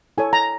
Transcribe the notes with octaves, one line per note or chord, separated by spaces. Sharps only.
E4 A4 C#5 G#5
A#5